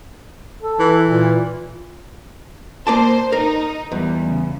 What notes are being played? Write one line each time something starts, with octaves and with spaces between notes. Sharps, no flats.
A4
E3
A#2
A#3 C5 D5 A5
D#4 A#4
E2 G3
C#3